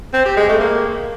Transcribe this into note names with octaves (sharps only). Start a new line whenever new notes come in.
C4
G4
G#3
A3
A#3